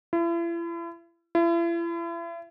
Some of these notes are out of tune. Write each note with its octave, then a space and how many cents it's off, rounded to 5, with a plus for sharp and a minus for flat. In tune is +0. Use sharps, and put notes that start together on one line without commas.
E4 +40
E4 +40